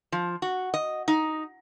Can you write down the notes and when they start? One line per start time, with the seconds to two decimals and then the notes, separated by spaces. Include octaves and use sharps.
0.12 F3
0.42 F#4
0.74 D#5
1.08 D#4